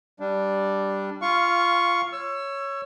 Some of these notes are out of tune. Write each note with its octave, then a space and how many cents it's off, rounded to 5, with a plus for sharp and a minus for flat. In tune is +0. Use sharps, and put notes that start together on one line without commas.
G3 +0 D4 +0
F4 -15 F5 +0 C#6 +0
C#5 +0 E6 +30